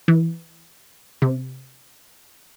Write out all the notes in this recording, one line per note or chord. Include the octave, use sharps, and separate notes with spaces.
E3
C3